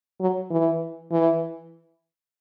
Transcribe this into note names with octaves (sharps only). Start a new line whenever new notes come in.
F#3
E3
E3